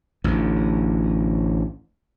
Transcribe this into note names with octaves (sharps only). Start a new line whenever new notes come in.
A1 D2